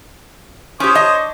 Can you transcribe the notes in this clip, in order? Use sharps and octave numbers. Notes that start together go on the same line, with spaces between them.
C#4 G4 C5 C#5 D#6
D4 D#5